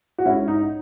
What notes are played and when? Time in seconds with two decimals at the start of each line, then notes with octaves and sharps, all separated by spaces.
0.18 F#4
0.25 G#2 C#4 E4
0.48 D#4